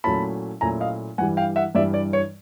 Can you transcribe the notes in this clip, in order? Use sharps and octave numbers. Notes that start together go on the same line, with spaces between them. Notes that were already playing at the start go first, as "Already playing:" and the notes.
A#2 F#3 A3 C#4 E4 A5 B5
A#2 F#3 A3 C#4 E4 G#5 A#5
D#5 F5
G2 E3 G3 F#5 G#5
F5 G5
E5 F#5
G2 E3 G3 D5 E5
D5
C#5